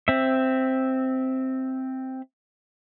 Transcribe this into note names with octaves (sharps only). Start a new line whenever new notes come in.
C4 E5